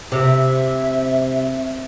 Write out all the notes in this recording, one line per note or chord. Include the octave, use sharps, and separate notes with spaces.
C3 E5